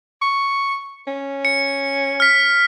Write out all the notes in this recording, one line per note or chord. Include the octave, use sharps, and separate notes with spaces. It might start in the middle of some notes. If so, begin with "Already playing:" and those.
C#6
C#4
C#7
F6 B6